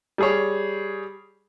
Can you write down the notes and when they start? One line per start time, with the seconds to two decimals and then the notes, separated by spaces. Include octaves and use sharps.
0.18 G3 G#4 C#5